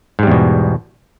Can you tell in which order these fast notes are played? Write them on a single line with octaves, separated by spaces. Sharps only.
G#2 G3 E2 B2